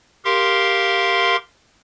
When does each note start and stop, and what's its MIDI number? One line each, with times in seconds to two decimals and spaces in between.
0.25 1.36 67
0.25 1.36 70
0.25 1.36 77
0.25 1.36 84